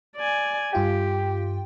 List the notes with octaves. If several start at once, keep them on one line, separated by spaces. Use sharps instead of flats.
D5 G#5
G2 F4 G4 G5